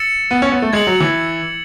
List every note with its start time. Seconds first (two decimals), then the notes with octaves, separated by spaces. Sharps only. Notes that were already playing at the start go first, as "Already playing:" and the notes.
Already playing: E6 A6 C#7 E7
0.31 B3
0.42 C#4
0.52 B3
0.62 A3
0.73 G#3 G#6 C#7 F#7
0.87 F#3
1.00 E3